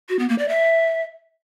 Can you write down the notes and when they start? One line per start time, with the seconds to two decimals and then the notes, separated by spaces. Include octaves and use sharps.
0.09 F#4
0.19 B3
0.29 A#3
0.39 D5
0.49 E5